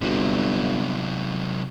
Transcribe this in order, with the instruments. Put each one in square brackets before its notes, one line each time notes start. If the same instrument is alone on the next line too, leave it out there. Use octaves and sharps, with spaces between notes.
[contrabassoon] G1 [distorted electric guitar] C3 F#3